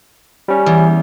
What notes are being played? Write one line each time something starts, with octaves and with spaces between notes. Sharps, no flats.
G3 C#4
E2